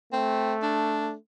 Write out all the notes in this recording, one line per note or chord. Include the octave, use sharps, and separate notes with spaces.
A3 C4
D4